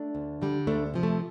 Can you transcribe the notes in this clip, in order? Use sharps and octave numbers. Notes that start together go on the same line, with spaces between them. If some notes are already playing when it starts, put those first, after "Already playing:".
Already playing: A3 D4
D2
D3 G3
D2 A3 D4
C3 F3
A3